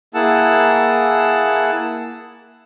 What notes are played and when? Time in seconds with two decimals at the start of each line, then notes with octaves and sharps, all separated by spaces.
0.14 A#3 E4 G#4 F#5 A5 E6